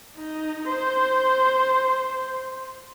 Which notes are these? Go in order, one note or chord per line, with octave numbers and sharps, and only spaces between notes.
D#4
C5